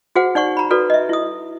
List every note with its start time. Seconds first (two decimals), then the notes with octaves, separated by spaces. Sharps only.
0.16 F#4 G#4 C5 F#5
0.35 D#4 D5 F#5 C#6
0.57 A#5 B5
0.71 F#4 A4 B4 D5
0.90 D#5 E5
1.09 E4 D#6